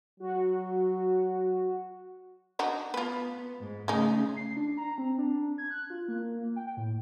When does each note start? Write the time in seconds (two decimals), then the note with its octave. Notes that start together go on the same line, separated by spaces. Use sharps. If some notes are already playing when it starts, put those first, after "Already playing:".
0.20 F#3 F#4
2.59 D4 D#4 F#4
2.94 B3 F4 B4
3.59 G#2
3.88 C#3 G#3 A3 D#4
4.36 C7
4.56 D4
4.77 A#5
4.98 C4
5.18 D4
5.58 G#6
5.71 F#6
5.90 F4
6.08 A#3
6.56 G5
6.77 A2